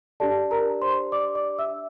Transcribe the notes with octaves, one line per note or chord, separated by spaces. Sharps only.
D4 G4 A4 D5 A5
A#4 A#5
C5 C6
D5 D6
D5 D6
E5 E6